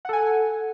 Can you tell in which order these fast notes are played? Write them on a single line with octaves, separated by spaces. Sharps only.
F#5 A4 G#5